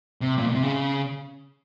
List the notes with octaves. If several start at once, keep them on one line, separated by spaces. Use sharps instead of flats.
C3
A#2
B2
C3
C#3